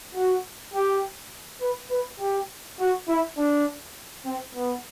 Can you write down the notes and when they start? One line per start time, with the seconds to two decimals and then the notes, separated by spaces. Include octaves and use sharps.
0.15 F#4
0.74 G4
1.61 B4
1.90 B4
2.20 G4
2.79 F#4
3.08 E4
3.37 D4
4.26 C4
4.55 B3